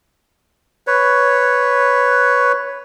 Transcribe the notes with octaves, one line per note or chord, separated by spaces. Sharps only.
B4 C#5